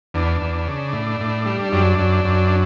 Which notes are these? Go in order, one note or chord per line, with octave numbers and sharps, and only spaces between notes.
E2 D4
E2
C#3
A2
A2
G3
F#2 D4
F#2
F#2